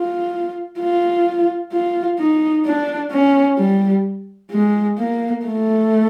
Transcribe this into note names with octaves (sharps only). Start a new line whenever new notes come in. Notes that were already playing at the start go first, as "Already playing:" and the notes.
Already playing: F4
F4
F4
D#4
D4
C#4
G3
G#3
A#3
A3